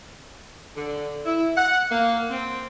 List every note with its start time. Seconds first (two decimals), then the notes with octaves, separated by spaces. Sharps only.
0.75 D3
1.25 E4
1.56 F#5
1.91 A#3
2.30 C4